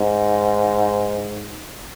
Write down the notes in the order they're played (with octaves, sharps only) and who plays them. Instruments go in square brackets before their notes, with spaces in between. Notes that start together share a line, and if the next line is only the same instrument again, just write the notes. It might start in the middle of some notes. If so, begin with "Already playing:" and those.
Already playing: [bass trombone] G#2